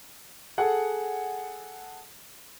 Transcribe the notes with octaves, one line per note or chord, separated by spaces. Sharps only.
G#4 A4 F#5